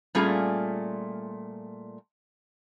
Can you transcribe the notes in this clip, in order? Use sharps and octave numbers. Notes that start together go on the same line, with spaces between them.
A#2 G3 A3 C#4 F4 G#4